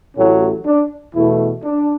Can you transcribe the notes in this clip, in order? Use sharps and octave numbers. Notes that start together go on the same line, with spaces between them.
A1 A2 F#3 C#4
D4
E2 B2 A3 E4
D4